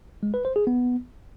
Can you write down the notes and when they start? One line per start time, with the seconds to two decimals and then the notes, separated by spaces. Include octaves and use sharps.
0.23 G#3
0.34 B4
0.45 C5
0.56 G#4
0.67 B3